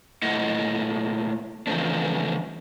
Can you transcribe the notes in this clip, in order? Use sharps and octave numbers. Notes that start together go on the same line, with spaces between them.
A#2 A3 E4 D#5 F#5
C#3 E3 F3 A3 C4 D4